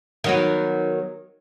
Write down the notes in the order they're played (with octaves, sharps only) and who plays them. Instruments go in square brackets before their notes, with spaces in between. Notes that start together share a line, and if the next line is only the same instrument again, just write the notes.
[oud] D#3 F#3 B3